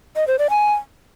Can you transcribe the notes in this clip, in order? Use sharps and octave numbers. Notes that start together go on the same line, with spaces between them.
D#5
C5
D5
G#5